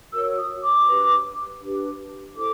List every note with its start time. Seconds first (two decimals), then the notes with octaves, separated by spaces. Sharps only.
0.13 F#4 A#4 C#5 E6
0.38 D#6
0.63 D6
0.88 D4 G4 B4
1.62 D4 G4 B4
2.36 E4 A4 C5 D6